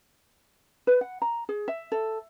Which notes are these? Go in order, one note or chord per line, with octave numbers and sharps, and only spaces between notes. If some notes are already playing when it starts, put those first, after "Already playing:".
B4
F#5
A#5
G#4
E5
A4